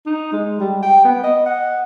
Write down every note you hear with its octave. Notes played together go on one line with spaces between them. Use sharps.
D#4
G#3
G3
G5
B3
D#5
F#5